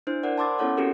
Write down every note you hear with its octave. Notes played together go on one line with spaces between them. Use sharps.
D4 E4 C5
A#4 C5 D5 F#5
A5 B5 C6 D6 E6 A6
B3 C#4 E4 A4 C#5 F#5
C4 C#4 F#4 G4 A4 A#4